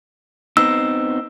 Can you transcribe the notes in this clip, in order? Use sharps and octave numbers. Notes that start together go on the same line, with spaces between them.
B3 C4 D#4 E6